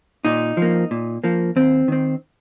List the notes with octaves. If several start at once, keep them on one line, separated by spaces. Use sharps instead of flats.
A#2 D#4
F3
A#3
A#2
F3 A#3
D#2 C4
D#3 C4